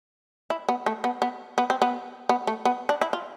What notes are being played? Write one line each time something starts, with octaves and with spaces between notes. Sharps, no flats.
E4
B3
A3
B3
B3
B3
C4
B3
B3
A3
B3
D4
E4
F4